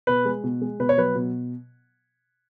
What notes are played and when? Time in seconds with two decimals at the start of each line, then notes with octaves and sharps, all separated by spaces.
0.07 B2 B4
0.25 G#3
0.44 B2
0.61 G#3
0.79 B2 B4
0.89 C#5
0.98 F#3 B4
1.15 B2